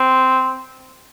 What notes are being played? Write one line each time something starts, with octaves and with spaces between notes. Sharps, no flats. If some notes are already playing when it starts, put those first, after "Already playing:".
Already playing: C4